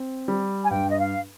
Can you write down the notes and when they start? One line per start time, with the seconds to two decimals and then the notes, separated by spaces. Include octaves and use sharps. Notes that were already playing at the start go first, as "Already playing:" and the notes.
Already playing: C4
0.28 G3
0.64 G#5
0.70 G2 G5
0.89 D#5
0.99 F5